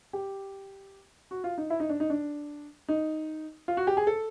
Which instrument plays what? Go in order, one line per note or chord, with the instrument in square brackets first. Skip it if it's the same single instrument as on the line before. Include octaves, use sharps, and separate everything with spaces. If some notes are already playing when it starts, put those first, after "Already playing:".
[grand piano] G4
F#4
F4
D#4
E4
D#4
D4
D#4
D4
D#4
F4
F#4
G4
G#4
A4